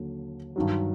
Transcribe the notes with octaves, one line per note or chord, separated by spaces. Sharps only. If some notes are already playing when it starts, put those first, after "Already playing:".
Already playing: D#2 D3 F#3
G2 D#3 F#3